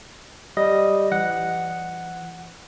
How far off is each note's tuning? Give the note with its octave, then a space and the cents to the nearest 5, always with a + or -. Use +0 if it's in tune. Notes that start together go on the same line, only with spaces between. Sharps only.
G3 +0 D#5 +0
E3 +40 F#5 +0